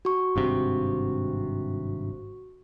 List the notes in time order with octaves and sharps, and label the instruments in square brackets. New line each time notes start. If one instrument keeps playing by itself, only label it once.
[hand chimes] F#4 C#6
[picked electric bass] G#1 G2 C3